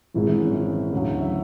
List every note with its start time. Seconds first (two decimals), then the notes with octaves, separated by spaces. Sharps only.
0.14 G#1 G#2 E3 G#3 E4
0.27 E3 E4
0.41 C#4
0.53 E3 E4
0.93 D2 C#3 F#3
1.21 E5